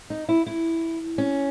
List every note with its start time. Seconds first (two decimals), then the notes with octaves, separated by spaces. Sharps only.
0.10 D#4
0.29 E4
0.47 E4
1.18 C#4